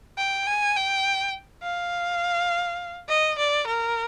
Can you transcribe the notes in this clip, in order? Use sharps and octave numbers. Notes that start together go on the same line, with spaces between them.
G5
G#5
G5
F5
D#5
D5
A#4